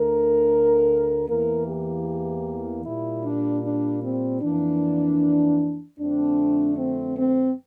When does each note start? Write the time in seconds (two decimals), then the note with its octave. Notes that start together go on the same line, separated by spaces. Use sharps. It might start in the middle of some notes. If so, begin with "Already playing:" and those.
Already playing: D2 D3 A3 A#4
1.27 E2 E3 A#3 A#4
1.67 G4
2.84 A#2 G3 A#3 E4
3.24 D4
3.64 D4
4.03 C4
4.41 F2 E3 A#3 D4
5.98 F2 D3 A3 C4 D4
6.77 C4
7.16 C4